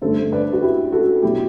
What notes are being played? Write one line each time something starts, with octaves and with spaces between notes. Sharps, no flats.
G2 D3 A3 A4 C5
B4 D5
F#4
E4 G4
F#4 A4
B2 F#3 E4 G4